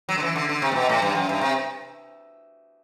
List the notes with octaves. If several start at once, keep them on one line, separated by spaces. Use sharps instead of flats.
F#3
D3
E3
D3
D3
C3
A2
B2
A2
G2
F#2
G2
C3